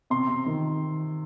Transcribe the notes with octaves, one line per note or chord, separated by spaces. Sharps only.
C3 C6
C3
D#3